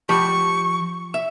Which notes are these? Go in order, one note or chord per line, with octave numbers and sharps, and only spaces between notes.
F3 G4 B5 C#6
E5